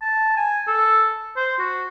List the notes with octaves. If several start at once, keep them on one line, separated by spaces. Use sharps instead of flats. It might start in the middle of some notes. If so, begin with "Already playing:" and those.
A5
G#5
A4
C5
F#4